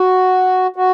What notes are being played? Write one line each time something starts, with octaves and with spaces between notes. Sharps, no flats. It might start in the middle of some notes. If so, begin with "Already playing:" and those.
Already playing: F#4
F#4